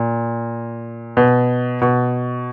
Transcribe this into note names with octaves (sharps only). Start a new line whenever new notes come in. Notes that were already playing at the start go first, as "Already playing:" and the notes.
Already playing: A#2
B2
B2